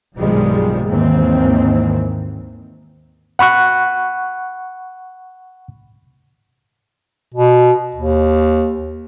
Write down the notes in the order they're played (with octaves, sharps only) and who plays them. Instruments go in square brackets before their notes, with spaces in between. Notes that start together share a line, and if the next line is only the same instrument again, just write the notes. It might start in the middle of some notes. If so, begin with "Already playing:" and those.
[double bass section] B1 G2 D#3 F3 G3 G#3
D#2 G#2 D#3 E3 A#3 C4
[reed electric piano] F#5 B5 C#6 F#6
[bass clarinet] B2
D#2